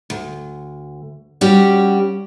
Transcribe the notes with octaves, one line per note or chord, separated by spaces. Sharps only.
D2
G3 C#4 F#4 G4